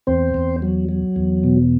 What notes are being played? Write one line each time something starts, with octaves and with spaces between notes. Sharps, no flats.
E2 C4 C5
E2
F#3
F#3
E2
B2